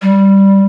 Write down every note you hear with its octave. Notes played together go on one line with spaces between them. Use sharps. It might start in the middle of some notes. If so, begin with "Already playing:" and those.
G3